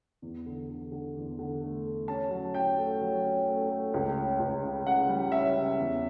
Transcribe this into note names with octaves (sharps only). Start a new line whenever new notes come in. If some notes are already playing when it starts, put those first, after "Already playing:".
E2
D3
D3
D3
E2
D3
A3
A3
C#4 A5
F#3
C#4 G5
A3
F#3
C#4
A3
A3
C#2
C#4
C#2
C#3
C#3 F#5
G3
C#4 E5
C#4
E2